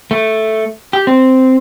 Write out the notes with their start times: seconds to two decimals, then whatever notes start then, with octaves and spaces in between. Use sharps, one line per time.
0.11 A3
0.93 G4
1.07 C4